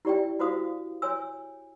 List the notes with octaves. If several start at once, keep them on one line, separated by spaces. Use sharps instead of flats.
E4 G4 D5 E5 G5
E4 F#4 C5 F5 D#6
C#5 G#5 E6